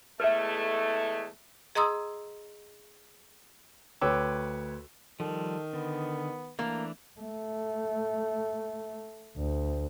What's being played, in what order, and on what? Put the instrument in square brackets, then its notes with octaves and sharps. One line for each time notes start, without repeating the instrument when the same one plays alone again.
[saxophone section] E2 G#3 A3 [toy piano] B4 E5
[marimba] G#4 D#5 A#5 C6 D#6 E6
[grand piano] D2 B4 C#5 G5 D6 E6
[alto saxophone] D#3 [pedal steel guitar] F3 G3 [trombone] A4
[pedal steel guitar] D3 [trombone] B3
[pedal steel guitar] E3 A3 D4 [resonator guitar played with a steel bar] A#3
[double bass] A3
D2